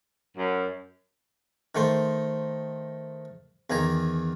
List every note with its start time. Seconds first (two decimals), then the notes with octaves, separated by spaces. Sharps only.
0.37 F#2
1.75 D#3 A3 C5
3.70 E2 D#3 G#5 A#5